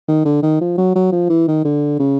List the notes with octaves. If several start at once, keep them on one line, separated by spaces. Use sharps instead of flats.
D#3
D3
D#3
F3
F#3
F#3
F3
E3
D#3
D3
C#3